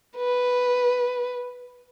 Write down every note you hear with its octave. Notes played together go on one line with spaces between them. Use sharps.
B4